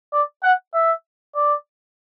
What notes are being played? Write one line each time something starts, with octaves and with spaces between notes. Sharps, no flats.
D5
F#5
E5
D5